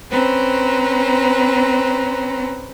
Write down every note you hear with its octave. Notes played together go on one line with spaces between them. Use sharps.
C4 C#4 B4 C5 A#5